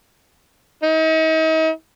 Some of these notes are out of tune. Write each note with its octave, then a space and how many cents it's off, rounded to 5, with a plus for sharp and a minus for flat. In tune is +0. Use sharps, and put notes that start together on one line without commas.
D#4 +40